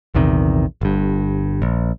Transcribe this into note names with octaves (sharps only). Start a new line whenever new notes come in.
A#1 E2 C3 D#3
G1 G2
A#1